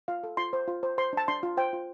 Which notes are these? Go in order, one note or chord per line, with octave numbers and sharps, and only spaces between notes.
F4 F5
A4
F4 C6
C5
F4
C5
C5 C6
D4 A5
D4 C6
F4
C5 G5
F4